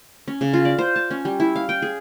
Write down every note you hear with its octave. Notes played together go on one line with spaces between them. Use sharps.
C#4
C#3
F4
D5
C5
A5
C#4
G3
E4
F5
G5
G#4